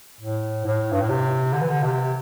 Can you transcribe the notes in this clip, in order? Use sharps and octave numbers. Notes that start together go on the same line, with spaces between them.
A2
A2
G2
A2
C3
D3
E3
D3
C3